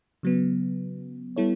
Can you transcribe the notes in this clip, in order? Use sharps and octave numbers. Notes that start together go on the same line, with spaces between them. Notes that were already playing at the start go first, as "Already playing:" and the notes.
C#3 F#3 B3
G3 B3 E4 A4 C#5